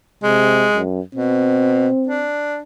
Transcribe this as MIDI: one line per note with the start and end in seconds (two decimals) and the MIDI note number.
0.23 0.67 48
0.23 0.79 56
0.74 1.00 42
1.15 1.88 47
1.15 2.30 60
2.07 2.59 62